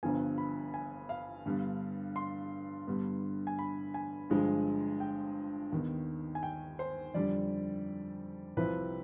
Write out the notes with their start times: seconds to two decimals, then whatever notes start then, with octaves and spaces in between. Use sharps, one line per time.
0.03 G1 G2 F3 B3 G#5
0.38 B5
0.74 G#5
1.09 F5
1.45 G2 D3 G3 B3
2.16 C6
2.87 G2 D3 G3 B3
3.47 G#5
3.59 B5
3.94 G#5
4.30 G1 G2 F3 G#3
5.00 G5
5.72 D#2 D#3 B3
6.35 G#5
6.43 G5
6.79 C5
7.14 F2 D3 G3 D5
8.57 C2 C3 F3 B4